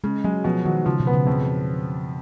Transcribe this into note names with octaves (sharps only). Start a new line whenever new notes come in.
C#3 G#3
F#3 G#3
B2 F3
D#3 F#3
C#3 F3
B2
B3
C#3
F2